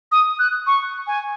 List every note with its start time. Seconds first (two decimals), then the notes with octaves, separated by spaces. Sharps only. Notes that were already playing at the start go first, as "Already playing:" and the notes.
0.12 D#6
0.39 F#6
0.67 C#6
1.07 G#5